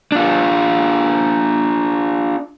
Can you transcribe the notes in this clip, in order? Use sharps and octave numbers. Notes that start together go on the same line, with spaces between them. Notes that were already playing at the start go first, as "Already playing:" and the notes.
D4 F4